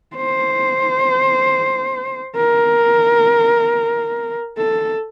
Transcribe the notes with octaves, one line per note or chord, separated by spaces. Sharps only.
C5
A#4
A4